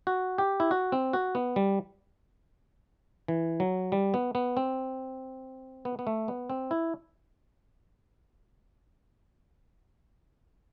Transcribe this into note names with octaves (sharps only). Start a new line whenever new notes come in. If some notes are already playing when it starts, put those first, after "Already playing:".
F#4
G4
E4
F#4
C4
F#4
B3
G3
E3
F#3
G3
B3
B3
C4
B3
B3
A3
B3
C4
E4